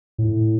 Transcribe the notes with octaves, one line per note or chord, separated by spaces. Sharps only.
A2